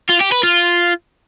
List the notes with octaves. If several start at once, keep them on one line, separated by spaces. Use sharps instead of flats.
F4
G4
B4
F4